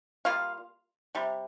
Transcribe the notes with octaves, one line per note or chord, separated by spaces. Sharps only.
G3 A#3 F4 F5
C3 G3